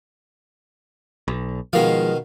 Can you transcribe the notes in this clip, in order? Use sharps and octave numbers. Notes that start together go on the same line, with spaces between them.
B1
B2 D#3 F3 G#3 F5